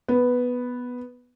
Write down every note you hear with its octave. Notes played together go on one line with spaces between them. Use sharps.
B3